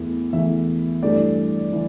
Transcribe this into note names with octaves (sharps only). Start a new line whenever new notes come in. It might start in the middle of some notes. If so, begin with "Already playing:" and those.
Already playing: E2 E3 A3
E2 E3 A3 E5
G2 E3 A3 D5
E3